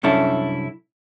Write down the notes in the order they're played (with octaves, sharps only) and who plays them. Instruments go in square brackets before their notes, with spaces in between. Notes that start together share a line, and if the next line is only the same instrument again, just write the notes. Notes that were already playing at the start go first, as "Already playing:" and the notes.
[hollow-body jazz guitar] C2 F#2 C#4 D4 E4 A4